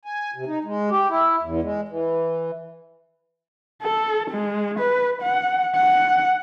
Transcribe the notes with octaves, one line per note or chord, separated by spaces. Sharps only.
G#5
C3
D#4
G#3
G4
E4
E2
G#3
E3
A4
G#3
B4
F#5
F#5